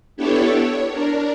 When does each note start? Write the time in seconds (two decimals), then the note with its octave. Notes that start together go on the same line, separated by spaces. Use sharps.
0.17 B3 D4 E4 G4 A4 C#5
0.51 C#5
0.90 D4 A#4